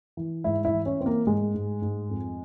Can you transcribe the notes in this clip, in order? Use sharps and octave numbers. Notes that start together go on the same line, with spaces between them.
E3
G#2 E4
E4
E3
C#4
E3 C4
A#3
G#2 G#3
G#2
G#2
F2